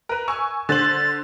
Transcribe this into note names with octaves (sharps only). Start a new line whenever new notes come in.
A#4 B4
G#5 C#6 E6
D3 C5 A6 F#7